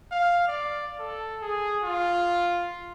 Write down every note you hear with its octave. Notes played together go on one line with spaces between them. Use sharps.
F5
D5
A4
G#4
F4